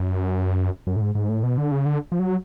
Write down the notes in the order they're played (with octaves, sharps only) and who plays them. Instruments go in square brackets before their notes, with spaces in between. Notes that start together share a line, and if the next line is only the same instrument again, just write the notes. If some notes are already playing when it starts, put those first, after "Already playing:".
Already playing: [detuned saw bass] F#2
F#2
A2
G#2
G#2
A2
B2
D3
C#3
D3
F3
F#3